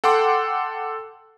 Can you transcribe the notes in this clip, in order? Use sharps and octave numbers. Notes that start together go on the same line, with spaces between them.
A4 F#5 G5 C6 D6